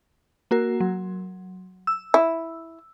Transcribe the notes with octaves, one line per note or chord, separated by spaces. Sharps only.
A#3 F#4 A#4
F#3
E6
E4